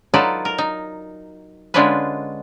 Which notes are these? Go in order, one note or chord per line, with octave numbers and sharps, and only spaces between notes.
F#3 D#4 F4 A4 B4 D5
A#4
D#4
D3 G#3 C#4 D4 F4 B4